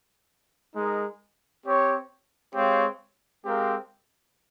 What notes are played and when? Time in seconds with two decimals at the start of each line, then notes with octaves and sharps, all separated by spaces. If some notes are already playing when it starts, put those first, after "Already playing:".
0.74 G#3 D#4 A#4
1.64 C4 G4 C#5
2.54 G#3 C4 G4 C#5 F5
3.44 G#3 C4 G4 A#4 F5